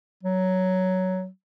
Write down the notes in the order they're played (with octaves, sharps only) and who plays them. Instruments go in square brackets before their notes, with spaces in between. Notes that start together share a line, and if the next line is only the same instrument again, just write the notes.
[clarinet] F#3